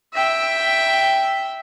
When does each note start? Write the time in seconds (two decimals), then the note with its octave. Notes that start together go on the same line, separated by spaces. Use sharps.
0.14 E5 G5